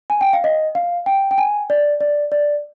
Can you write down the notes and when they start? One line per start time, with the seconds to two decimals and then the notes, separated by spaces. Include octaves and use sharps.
0.10 G#5
0.21 G5
0.33 F5
0.44 D#5
0.75 F5
1.06 G5
1.31 G5
1.38 G#5
1.70 D5
2.01 D5
2.32 D5